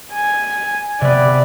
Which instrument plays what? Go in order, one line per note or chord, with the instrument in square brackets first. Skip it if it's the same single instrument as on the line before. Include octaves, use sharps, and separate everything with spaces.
[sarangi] G#5
[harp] C3 B3 [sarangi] D5